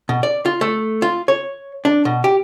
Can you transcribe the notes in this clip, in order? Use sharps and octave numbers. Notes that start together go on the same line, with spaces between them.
B2
D5
F4
A3
F4
C#5
D4
B2
G4